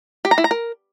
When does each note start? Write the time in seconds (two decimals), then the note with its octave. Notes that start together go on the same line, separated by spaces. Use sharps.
0.25 G4
0.31 A#5
0.38 E4
0.44 A#5
0.51 A#4